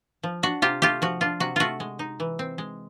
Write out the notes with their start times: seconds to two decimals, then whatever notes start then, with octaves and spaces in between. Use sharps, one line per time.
0.23 F3
0.43 D4 F#4
0.62 C3 F4 G4
0.82 A3 F4 G4
1.02 F3 F#4
1.21 D4 F4
1.40 C3 F#4
1.56 A3 F4 F#4
1.80 G#3
1.99 D#4
2.20 E3
2.39 C4
2.58 G#3